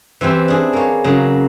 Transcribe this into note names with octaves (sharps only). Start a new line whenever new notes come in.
E3 C4 E4 G4 C5
D4 G#4
A#3 C#5
C#3 F#3 A#3